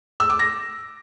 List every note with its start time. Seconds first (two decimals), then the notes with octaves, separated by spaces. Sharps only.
0.20 E6
0.30 D6
0.39 A#6